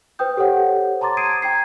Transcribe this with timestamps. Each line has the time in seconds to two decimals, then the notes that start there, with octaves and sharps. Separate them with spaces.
0.19 B4 C5 G5 D#6 G6
0.37 G4 A4 C5 C#5 F#5
1.01 A5 A#5 C6 D6 A6
1.17 D#6 G#6 C7 D7 D#7
1.42 G5 A#5 G#6 C7